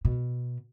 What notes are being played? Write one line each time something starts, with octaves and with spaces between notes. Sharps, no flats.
B2